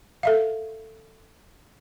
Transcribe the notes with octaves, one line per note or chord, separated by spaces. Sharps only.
A4 E5 F5